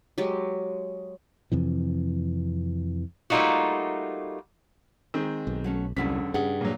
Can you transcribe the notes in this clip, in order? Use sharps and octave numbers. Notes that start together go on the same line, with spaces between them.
F#3 G#3 G4
F2 C3 E3
G3 A3 A#3 D#4 F4 F#4
D#3 G#3 C4
B1
F#3 A3 C#4
E1 C2 D3 F#3 C#4 B6
G2 C#3 G#4 F#5
A#2 F#3